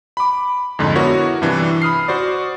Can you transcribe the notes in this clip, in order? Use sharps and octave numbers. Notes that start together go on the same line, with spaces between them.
B5 D6
F2 G#2 D3 D#4
B3 E4 F#4 A#4 C#5
G2 C3 E3 D4
B5 D#6 F6 C7
F#4 C5 D5